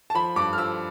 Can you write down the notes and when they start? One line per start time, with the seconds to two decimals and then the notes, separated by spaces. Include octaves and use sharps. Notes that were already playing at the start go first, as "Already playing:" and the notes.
0.10 A5
0.14 F3 B5
0.36 G2 D6
0.53 F6
0.58 F3 E6